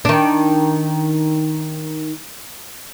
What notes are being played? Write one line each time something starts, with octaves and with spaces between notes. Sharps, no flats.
D#3 D4